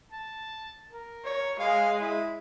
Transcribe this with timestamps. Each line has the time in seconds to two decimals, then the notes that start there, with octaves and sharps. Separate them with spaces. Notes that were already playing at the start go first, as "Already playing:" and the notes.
0.12 A5
0.91 A#4
1.25 C#5
1.60 G#3 F5
2.01 E4